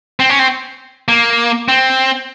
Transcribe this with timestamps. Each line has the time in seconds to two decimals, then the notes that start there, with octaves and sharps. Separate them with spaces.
0.20 C4
0.30 C#4
0.39 C4
1.08 A#3
1.68 C4